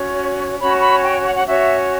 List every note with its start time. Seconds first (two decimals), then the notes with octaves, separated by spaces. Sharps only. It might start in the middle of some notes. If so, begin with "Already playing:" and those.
Already playing: C#4 F#4 C#5
0.59 C#4 F#4 C#5 B5
0.80 B5
1.02 G5
1.24 F#5
1.34 F#5
1.45 C#4 F#4 C#5 E5